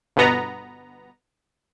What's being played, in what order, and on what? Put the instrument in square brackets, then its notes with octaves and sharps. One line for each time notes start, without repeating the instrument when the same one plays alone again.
[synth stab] G1 B2 B3 A#5